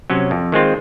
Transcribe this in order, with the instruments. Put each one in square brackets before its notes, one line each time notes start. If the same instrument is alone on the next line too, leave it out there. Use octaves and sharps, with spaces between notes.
[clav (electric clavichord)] C3 F#3 C#4
F2
D#3 G#3 C4 F4